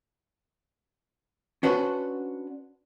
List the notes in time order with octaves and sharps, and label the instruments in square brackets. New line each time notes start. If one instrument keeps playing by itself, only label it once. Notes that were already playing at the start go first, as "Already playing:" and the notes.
[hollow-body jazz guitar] C#4 D4 F#4 B4 C5